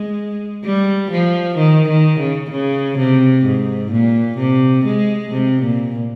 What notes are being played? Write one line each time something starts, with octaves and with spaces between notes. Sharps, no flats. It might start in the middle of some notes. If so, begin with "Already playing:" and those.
Already playing: G#3
G3
F3
D#3
D#3
C#3
C#3
C3
G#2
A#2
C3
G#3
C3
A#2